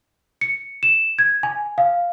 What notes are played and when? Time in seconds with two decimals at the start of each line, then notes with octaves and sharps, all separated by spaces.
0.41 C#7
0.83 E7
1.19 G#6
1.43 G#5
1.78 F5